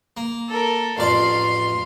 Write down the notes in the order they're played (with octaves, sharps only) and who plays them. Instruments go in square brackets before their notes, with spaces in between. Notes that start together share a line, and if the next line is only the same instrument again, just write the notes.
[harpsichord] A#3
[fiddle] A4 A#4
[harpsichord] A1 F2 D5 [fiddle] F5 C6